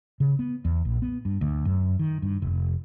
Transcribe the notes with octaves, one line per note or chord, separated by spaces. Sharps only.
C#3
B3
E2
A#1
B3
G2
D2
F#2
D#3
G2
F1